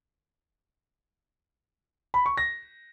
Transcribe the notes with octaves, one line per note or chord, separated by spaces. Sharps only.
B5
C#6
A#6